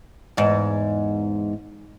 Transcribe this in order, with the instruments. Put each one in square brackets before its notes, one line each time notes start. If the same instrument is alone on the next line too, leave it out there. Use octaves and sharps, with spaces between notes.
[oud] E2 G#2